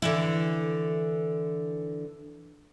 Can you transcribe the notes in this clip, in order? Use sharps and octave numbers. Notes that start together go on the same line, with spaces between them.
D3 E3 E4